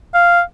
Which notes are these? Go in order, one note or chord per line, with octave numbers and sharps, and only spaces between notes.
F5